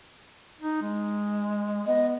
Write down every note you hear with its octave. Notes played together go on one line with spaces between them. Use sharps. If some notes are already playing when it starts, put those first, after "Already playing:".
D#4
G#3
B3 D#5